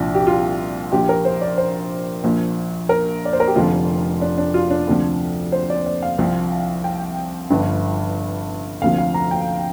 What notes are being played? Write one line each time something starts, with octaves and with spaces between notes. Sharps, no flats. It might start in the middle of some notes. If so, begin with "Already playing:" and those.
Already playing: C2 A#2 F3 D4 F4
G4
F4
A#1 A#2 F3 G4
A#4
C5
D5
C5
A#1 A#2 F3
A#4
D5
C5
A#4
G4
F1 F2 D3 F3 F4
D4
D4
F4
D4
D2 C3 F3
C5
D5
D5
F5
C2 C3 F3
G5
G1 G2 F3
D2 C3 F3 F5
F5
A#5
G5